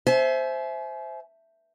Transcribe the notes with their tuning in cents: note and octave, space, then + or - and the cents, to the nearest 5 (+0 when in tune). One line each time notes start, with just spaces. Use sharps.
C5 +0 E5 +0 G#5 +40